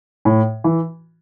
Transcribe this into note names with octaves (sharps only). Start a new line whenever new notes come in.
A2
E3